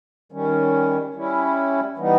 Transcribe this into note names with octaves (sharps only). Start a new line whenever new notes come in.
D#3 G3 C#4
G3 C#4 E4
E3 G3 B3 D#4